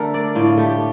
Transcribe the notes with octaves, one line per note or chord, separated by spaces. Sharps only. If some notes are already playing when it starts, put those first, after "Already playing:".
Already playing: D3 A3 A#4 C5
D4 D5
A2 F4
A3 G4
G4